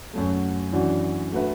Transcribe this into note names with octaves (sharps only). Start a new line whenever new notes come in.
F#2 F#3 A3
F#2 E3 D4 F#4
A3 F#4 B4 E5